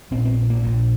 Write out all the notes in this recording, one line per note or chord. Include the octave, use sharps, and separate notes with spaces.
A#1 A#2 C4
C4
A#3
A#1 A#2